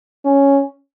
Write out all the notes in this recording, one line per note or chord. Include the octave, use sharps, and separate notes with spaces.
C#4